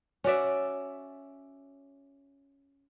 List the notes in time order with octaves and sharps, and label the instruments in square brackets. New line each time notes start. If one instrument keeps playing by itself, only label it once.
[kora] C#4 F#4 D5 E5